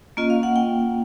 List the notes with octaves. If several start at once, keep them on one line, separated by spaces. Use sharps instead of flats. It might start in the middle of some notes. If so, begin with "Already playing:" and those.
A#3 C#4 F4 D#5
F5
F#5
G5